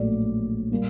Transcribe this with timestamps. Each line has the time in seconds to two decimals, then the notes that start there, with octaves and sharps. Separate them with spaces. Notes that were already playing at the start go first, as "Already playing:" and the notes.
Already playing: A#1 A2 F#3 A3 D5
0.71 A#2 G3 A#3